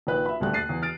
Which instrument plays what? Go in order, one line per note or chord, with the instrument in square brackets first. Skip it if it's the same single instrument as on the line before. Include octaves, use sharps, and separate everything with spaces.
[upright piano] A#1 D#3 B4 F#6
E5 B5
D#1 D2 G3 A3 F#6
F#6 A6 C7 D#7
E2
F6 A6 D7